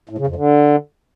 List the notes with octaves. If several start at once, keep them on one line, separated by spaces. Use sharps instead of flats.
A2
C#3
F2
D3